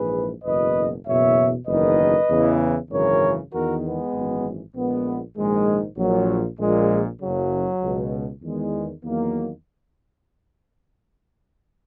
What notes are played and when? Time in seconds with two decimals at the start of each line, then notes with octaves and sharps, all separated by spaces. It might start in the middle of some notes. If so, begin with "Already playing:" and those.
Already playing: A#1 G#2 E3 G#4 B4
0.44 F#1 E2 B2 B4 D#5
1.05 F#1 E2 B2 C#5 E5
1.67 F#1 E2 D#3 B4 D#5
2.29 E2 C#3 E3
2.90 G#1 F#2 C#3 E3 A#4 C#5
3.51 E2 D#3 F#4 A#4
3.82 G#3 B3
4.13 G#1 F#2 E3
4.74 A#1 A#2 G#3 B3
5.35 A#1 G#2 D#3 G#3
5.97 A#1 A#2 F#3
6.58 A#1 A#2 G#3
7.20 F#1 F#2 C#3 F#3
7.82 C#2 B2
8.42 E2 D#3 G#3
9.04 E2 D#3 F#3 A#3